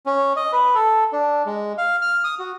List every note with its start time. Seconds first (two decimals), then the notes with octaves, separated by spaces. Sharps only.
0.06 C#4
0.36 D#5
0.53 B4
0.75 A4
1.13 D4
1.46 G#3
1.78 F5
2.02 F6
2.24 D#6
2.39 F#4